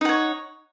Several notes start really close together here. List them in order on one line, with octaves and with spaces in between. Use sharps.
D#4 F#5 C#5